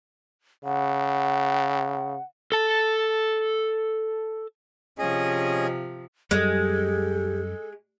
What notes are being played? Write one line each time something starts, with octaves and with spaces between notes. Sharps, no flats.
C#3 F#5
A4 A5
C3 F3 C#4 G#4 D#5
F#2 G3 G#3 G4 A4